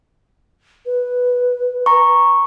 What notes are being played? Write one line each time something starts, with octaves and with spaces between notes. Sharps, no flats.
B4
A#5 C#6